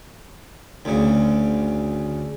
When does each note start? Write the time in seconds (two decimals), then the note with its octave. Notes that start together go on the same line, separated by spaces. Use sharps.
0.85 D2 C#3